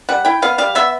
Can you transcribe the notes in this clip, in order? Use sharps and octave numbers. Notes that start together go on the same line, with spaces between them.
G3 F#5
E4 G5
B3 F5
G3 F5
B3 E5